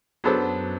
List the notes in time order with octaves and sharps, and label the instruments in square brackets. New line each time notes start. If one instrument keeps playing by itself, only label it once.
[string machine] F#2 [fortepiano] F#3 B3 D4 A4 C5